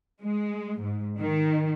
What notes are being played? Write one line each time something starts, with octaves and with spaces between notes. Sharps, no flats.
G#3
G#2
D#3